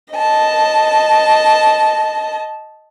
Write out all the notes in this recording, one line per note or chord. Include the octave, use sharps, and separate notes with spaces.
D#5 A5